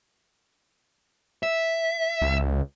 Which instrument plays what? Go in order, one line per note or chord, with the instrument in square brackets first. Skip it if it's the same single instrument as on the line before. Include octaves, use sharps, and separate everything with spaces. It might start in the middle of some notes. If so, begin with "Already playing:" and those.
[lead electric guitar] E5
[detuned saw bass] C#2